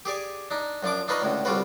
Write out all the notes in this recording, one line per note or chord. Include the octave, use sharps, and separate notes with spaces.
G4 G#4 D5 G#5
D4 D#4
F#2 F3 D4 D6
D4 D#4 F4 B4 C#5 D#5
C#2 A2 D3
C2 D3 G3 F4 F#4 B4